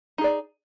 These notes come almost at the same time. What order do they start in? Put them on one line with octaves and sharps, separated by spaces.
D#4 G#4 D5